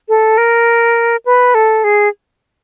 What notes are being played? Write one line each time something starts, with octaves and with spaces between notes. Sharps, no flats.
A4
A#4
B4
A4
G#4